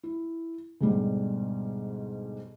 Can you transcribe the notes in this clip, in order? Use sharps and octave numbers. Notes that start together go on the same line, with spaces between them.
E4
D2 G#2 B2 G3